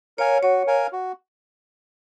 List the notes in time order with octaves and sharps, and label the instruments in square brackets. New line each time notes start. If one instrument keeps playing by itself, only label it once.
[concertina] A#4 F5 G#5 [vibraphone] C#5
[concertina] F#4 [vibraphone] C#5
[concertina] A#4 F5 G#5
F#4